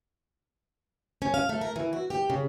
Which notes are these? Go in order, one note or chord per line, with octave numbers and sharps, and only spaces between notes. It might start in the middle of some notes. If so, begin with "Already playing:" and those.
C#4
F5
A3
A#4
E3
F#4
G4
C#3